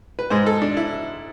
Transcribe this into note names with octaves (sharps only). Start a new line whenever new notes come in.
B4
G#2 G#3 C5
A4
D4
E4